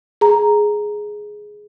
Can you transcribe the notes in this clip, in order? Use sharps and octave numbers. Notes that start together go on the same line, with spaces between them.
G#4 A#5